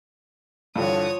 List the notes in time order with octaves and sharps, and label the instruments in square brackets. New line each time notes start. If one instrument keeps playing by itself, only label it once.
[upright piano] G2 D3 E3 [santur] F3 G5 [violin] C#5 D#6